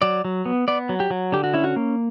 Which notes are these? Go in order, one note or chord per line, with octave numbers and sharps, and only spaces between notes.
F#3 D5
F#3
B3
B3 D5
F#3
G4
F#3
D3 G4
F#4
C#4 E4
F#4
A#3